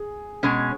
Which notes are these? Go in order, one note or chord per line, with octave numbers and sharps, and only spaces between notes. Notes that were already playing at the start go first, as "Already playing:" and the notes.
Already playing: G#4
B2 G#3 C#4